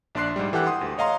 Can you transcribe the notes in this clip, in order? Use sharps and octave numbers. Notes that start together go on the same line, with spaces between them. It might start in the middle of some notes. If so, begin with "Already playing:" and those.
A#1 D4 D5 C6 F#6 C7
G#2 G3
E3 G4 A4 F#5 G5 F#6
F#5 C6 D#6
D2
C#5 D#5 F5 A#5 C6